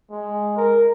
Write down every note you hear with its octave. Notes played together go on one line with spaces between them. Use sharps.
G#3
A#4